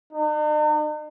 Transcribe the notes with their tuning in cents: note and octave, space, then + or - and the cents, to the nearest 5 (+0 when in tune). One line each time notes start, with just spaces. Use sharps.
D#4 -45